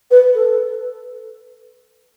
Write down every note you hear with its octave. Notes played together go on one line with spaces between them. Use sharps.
B4
A4